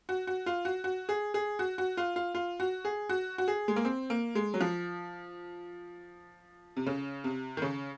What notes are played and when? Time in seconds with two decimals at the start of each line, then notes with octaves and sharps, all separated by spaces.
0.09 F#4
0.27 F#4
0.46 F4
0.65 F#4
0.84 F#4
1.09 G#4
1.34 G#4
1.59 F#4
1.78 F#4
1.97 F4
2.16 F4
2.35 F4
2.60 F#4
2.85 G#4
3.09 F#4
3.38 F#4
3.48 G#4
3.68 G#3
3.76 A#3
3.85 C4
4.10 A#3
4.35 G#3
4.54 F#3
4.61 F3
6.77 C3
6.86 C#3
7.24 C3
7.57 D#3
7.62 C#3